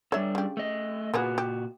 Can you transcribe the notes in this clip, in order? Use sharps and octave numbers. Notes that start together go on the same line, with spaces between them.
G3 D4 A4 C#5 E5
C#3 G4
A3 D#5
A#2 A#3 B3 F#4 G#4
G4